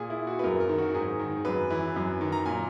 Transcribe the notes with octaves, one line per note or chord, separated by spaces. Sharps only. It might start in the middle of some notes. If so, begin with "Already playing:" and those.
Already playing: A#2 G#4
E4
F#4
B4
F#2 A#4
A#4
D#3
F#4
G#2 G#4
D#3
F#2 B4
E3
F#2
D#3
A#5
A#2 G#5